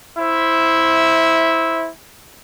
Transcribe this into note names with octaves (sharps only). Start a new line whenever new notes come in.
E4 C5 E5